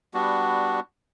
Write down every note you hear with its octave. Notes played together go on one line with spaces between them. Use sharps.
G3 B3 D4 F#4